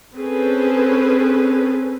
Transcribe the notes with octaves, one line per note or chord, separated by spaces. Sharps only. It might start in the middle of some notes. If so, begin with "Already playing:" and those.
C4 C#4 G#4 A4 B4